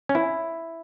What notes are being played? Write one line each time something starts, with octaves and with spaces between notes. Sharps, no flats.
C#4
E4